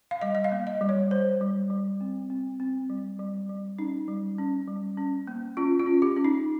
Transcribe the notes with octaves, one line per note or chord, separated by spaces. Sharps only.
F5
G3 D#5
D#5
F5
A#3
D#5
G3
C#5
G3 C5
G3
G3
C4
C4
C4
G3
G3
G3
C#4 D#4
G3
C#4
G3
C#4
A#3
C#4 F4
F4
C#4
G4
C#4
D#4